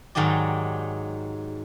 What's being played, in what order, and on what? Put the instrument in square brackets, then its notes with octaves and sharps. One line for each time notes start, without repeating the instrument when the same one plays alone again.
[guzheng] G#2 D#3 F#3 G4 D5